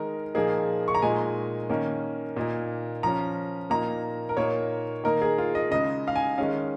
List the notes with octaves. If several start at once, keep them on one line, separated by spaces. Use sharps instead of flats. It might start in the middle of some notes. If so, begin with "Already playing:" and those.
Already playing: D#3 G#3 D#4 A#4
A#2 F3 A#3 D#4 G#4
C#6
A#5
A#2 G#3 D#4 G#5
D#3 A#3 C#4
A#2 A#3 D#4
F3 C#4 A#5
A#2 A#3 D#4 A#5
A#4
A#2 A#3 D#4 C#5
D#3 A#3 D#4 A#4
G#4
F4
D#5
C#3 G#3 D#4 D#5
F5
G#5
D#3 G#3 C#4 F5